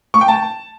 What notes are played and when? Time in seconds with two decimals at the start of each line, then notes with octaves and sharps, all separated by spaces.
0.14 C#6
0.21 G5
0.28 A5